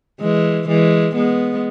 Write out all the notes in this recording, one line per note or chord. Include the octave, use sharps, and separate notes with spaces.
E3 G#3
E3 G#3
G#3 B3